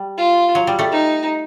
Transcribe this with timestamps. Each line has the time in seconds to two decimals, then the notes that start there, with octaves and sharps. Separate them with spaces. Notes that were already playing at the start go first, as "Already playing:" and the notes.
Already playing: G3
0.17 F4
0.55 F#3
0.67 G3
0.79 G3 A3
0.92 D#4